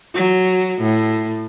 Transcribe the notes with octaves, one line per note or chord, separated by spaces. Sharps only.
F#3
A2